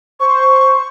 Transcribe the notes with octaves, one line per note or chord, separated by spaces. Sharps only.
C5 C#6